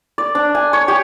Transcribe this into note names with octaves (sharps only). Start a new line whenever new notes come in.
D5
D4
G#5
C#5
G4